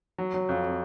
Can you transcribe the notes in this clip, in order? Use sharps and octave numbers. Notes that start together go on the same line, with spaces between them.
F#3
F#3
F2